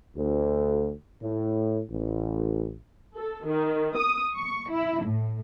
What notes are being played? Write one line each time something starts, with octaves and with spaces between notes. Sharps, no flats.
D2
A2
A1
A4
D#3
D#6
C#6
E4
A2